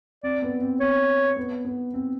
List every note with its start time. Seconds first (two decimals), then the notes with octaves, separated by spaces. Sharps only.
0.23 C4 D5
0.42 B3
0.61 C4
0.80 C4 C#5
1.37 B3
1.65 B3
1.94 C4